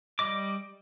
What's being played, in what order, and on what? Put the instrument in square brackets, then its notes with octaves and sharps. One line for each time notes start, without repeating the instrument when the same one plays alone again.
[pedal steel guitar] G3 D#5 D6